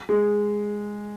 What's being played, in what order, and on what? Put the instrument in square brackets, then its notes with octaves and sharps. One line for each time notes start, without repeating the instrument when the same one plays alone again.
[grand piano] G#3